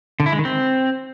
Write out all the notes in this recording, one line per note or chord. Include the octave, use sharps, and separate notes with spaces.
D3
E4
G#3
D#3
C4